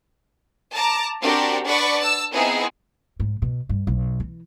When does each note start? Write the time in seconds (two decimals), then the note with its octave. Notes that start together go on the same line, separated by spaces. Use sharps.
0.73 A5 A#5 D6
1.22 C4 D4 F#4 G4 A#4 G5
1.65 D4 B4 D5 F#5 B5 C#6
1.99 A5 E6
2.32 B3 C4 D#4 E4 G#4
3.20 G#2
3.42 B2
3.69 G2
3.87 B1
4.20 E3